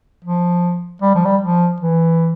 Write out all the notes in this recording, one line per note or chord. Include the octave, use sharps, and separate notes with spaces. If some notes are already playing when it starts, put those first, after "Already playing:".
F3
G3
F3
G3
F3
E3